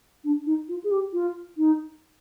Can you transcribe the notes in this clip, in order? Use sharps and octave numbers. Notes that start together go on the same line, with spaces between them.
D4
D#4
F4
G#4
G4
F4
D#4